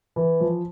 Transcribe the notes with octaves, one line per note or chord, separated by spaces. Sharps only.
E3
F3